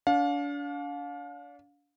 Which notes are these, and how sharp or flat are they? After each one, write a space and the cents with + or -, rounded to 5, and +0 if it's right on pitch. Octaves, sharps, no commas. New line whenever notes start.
D4 -35 F5 +30